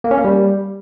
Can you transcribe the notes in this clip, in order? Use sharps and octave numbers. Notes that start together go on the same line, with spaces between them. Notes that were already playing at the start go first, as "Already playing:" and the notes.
A#3
C#4
A#3
G3